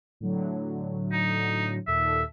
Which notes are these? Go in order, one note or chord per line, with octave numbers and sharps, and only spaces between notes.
A2 D3 F#3
D#4
D#2 A#2 A4 E5